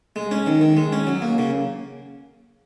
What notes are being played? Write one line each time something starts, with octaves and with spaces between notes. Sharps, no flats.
G#3
C#4
D#3
D#3
G#3
C#4
F#3
A#3
C#3